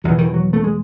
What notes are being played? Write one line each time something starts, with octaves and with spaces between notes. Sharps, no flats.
E2 B2 F#3
E3
D#3
E3
F#3
A3
G#3